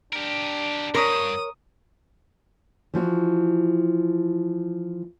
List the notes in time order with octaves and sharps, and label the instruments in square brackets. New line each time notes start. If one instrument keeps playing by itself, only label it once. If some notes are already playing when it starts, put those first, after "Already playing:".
[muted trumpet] D4 [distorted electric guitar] G4 A#4
[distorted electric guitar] G2 [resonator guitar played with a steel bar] A#4 C#5 [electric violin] D#6
[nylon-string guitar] E3 F3 F#4